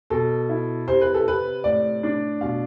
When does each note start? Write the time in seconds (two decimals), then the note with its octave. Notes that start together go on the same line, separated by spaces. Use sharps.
0.10 B2 A4
0.49 E4
0.87 C3 C5
1.01 B4
1.14 A4
1.26 C3 B4
1.64 A2 D5
2.03 D4
2.41 B2 F5